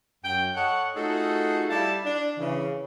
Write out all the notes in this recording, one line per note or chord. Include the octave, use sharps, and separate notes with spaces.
F#2 G5
A4 C#5 D#5 F#5
A3 D#4 F4 F#4 G#4 A4
G3 E4 D5 F5 A5
D4
C#3 E3